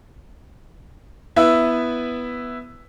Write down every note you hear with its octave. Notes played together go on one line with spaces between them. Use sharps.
B3 E4 B4 E5